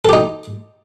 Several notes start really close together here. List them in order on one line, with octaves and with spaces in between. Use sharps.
A4 G4 D#4